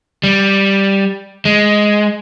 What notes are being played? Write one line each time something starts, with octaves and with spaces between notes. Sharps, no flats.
G3
G#3